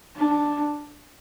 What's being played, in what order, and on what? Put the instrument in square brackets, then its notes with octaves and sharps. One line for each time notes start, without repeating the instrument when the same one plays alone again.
[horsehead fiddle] D4